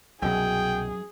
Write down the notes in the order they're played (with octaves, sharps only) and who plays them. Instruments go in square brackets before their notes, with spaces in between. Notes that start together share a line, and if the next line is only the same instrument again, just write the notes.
[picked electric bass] C2 B2 F#3 [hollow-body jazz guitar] F#2 [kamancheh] G#4 [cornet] G5